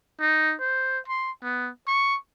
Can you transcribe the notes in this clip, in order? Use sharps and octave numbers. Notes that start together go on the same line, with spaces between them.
D#4
C5
C6
B3
C#6